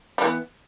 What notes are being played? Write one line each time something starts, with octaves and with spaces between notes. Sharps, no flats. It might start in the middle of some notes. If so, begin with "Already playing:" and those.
E3 G3 B3